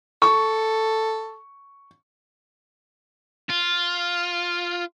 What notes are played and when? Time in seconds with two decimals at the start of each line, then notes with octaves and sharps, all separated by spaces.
0.22 A4 C#6
3.49 F4